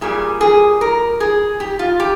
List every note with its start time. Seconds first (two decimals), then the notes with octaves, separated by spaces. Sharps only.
0.01 A#2 G3 G#4
0.41 G#4
0.81 A#4
1.20 G#4
1.60 G4
1.79 F4
2.00 G4